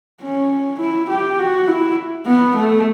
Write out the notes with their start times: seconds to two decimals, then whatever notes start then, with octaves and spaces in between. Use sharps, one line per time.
0.22 C#4
0.80 E4
1.09 G4
1.39 F#4
1.68 E4
2.26 B3
2.56 A3